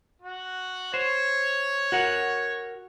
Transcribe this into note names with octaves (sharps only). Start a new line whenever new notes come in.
F#4
C5 C#5
F#4 A#4 F#5